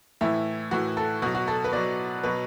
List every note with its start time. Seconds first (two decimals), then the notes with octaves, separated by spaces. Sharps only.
0.21 A2 E3 E4
0.71 A2 E3 F#4
0.97 A4
1.22 B2 F#4
1.26 F#3
1.35 F#4
1.48 A4
1.64 B4
1.73 B2 F#3 D5
2.24 B2 F#3 B4